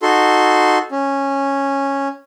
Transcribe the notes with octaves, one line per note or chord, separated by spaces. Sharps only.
D#4 F#4 A4 C6
C#4